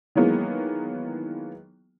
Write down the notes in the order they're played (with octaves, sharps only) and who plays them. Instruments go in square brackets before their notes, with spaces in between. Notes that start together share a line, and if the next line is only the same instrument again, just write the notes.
[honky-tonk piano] D#3 E3 F#3 G#3 A#3 B3